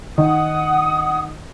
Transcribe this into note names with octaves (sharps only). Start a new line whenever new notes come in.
D#3 F#5 D#6